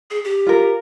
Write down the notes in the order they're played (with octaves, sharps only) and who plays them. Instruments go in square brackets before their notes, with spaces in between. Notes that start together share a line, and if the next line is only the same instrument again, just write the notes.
[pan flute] G#4
G4
[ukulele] F4 A#4